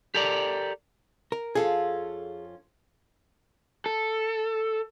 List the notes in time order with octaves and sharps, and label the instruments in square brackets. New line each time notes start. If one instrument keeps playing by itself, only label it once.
[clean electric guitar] G4 A4 A#4 D5
[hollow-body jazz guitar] A#4
[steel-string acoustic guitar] F2 C#4 F4 [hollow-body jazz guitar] G#4 A4
[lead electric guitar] A4